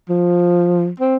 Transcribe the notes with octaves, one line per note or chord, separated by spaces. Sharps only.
F3
C4